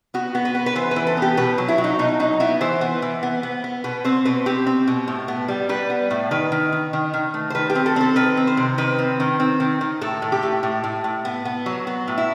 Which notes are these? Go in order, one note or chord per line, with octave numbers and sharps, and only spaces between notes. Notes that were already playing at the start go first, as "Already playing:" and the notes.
B3 F#4
B3
B4
B3
B4
E3 C5
B4
E3
A4
B3 G4
B2 B4
F#3
E4
F#3
D#4
B2 D#4
F#3 D#4
B3 E4
E3 C5
B3
E3
B3
B3
B3
B2 B4
C4 C5
B2 B4
C4 G4
C4
B2
A2
B3
G3
G3 B4
B3
A2
D#3 B4
D#3
D#3
D#3
D#3
A3
C5
D#3 B4
G4
C4
A4
C4 A4
D#3 B4
C4
C5
C3
D#3 B4
C4
D#3
C4
D#3
D#3
A2 A4
A2
G4
A2
A2
A2
A2
B3
B3
F#3
B3
A2
E4